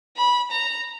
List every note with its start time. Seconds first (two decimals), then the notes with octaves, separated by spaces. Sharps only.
0.17 B5
0.51 A#5